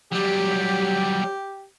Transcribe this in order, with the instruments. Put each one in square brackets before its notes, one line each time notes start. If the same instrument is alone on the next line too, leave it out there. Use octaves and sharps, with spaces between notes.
[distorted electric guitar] F#3 G3 [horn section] G4